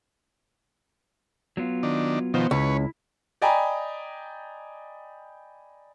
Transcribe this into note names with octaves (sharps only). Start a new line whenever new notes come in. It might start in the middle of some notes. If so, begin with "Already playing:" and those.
F#3 B3 F4
D#3 D4
B2 D#3 F3 B3 C5
C#2 E4 B4 C#5
D5 D#5 G5 G#5 A#5 B5